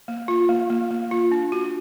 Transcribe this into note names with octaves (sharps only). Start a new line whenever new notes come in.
A#3
F4
A#3
A#3
A#3
F4
D4
F#4